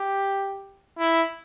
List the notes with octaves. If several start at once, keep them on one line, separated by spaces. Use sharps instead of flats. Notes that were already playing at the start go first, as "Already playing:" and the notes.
Already playing: G4
E4